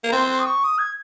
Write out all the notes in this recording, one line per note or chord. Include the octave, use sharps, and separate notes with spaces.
A#3
A#5
C4 C6
C6
D#6
C#6
D#6
G#6